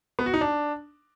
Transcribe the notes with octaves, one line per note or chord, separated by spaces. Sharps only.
B3
F#4
D#4
D4